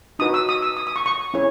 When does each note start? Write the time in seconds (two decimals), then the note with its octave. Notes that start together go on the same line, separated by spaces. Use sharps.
0.19 D#4 F#4 B4 D#6
0.34 E6
0.49 D#6
0.62 E6
0.77 D#6
0.87 D#6
0.96 C#6
1.06 C#6
1.34 C#4 E4 G#4 C#5